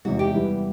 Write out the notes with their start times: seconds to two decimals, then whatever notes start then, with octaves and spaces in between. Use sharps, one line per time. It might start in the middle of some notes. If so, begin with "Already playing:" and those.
0.05 E2 C3 E3 G#3 F#4
0.19 G4
0.34 E3 G3 B3 E4